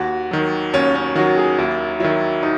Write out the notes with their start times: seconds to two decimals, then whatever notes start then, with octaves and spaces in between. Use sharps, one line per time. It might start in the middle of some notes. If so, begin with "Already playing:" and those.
Already playing: D#2 F#4
0.31 D#3 F#3
0.73 D#2 C#4
0.95 C#4
1.15 D#3 F#3 F#4
1.38 G#4
1.58 D#2 E4
2.00 D#3 F#3 E4
2.43 D#4